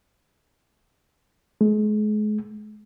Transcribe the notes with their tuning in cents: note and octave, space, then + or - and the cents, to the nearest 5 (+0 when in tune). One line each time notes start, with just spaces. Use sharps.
G#3 +35